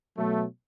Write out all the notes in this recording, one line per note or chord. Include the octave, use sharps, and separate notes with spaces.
B2 F#3 A3